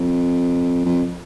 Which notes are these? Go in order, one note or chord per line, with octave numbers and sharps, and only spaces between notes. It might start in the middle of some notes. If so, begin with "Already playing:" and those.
Already playing: F2
F2